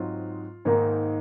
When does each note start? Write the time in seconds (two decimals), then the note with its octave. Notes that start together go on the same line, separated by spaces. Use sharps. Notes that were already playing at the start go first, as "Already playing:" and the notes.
Already playing: G#2 F#3 C4 D#4 F4
0.65 G#2 D#3 A#3 D#4